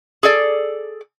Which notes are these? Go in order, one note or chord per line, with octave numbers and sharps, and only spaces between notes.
G#4 A4 D5